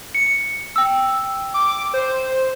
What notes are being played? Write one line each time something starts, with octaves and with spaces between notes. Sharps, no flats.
C#7
G5 E6
D6
C5